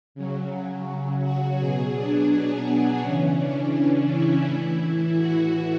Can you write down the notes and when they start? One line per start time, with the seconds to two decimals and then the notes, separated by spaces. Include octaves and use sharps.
0.15 C#3 F#3
1.23 F#4
1.58 B2 F#3 G#4
1.94 D4
2.30 B3
2.66 B3
3.01 C#3 E3 C#4
3.38 D4
4.09 E4
4.44 A2 E3
5.17 F#4